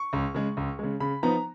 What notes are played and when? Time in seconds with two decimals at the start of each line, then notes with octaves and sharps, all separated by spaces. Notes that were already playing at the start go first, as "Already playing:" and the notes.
Already playing: C#6
0.13 C#2
0.35 C#3 G#3
0.57 C#2
0.79 C#3 G#3
1.00 C#3 B5
1.23 F3 B3 D#4 A#5